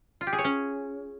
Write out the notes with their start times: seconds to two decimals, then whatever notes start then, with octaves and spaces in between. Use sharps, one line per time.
0.21 F4
0.27 G4
0.33 G#4
0.39 C#5
0.44 C#4